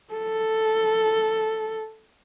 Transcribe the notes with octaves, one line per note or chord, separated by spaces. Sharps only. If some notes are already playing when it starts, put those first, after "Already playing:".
A4